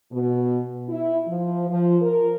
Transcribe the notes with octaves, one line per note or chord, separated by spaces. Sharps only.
B2
E4
F3
F3
A#4